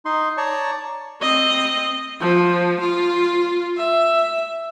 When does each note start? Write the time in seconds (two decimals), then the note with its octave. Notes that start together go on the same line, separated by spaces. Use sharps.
0.05 D#4 C6
0.37 C#5 D5 A5 A#5 C#6
1.21 C4 D#5
2.20 F3
2.80 F4
3.77 E5